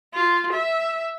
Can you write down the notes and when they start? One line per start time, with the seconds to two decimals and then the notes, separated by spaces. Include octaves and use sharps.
0.14 F4
0.53 E5